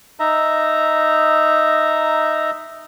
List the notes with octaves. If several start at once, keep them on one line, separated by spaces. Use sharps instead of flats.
D#4 E5 A#5